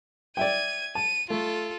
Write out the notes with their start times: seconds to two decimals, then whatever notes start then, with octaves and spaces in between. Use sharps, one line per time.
0.37 D5 E5 G5 G#6 D#7
0.95 A5 D#7
1.30 A3 F4 A4